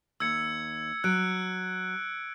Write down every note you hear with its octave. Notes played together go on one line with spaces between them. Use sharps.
D#2 E6 G#6 C#7
F#3 F#6 D7